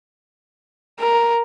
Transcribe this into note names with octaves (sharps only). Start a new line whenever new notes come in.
A#4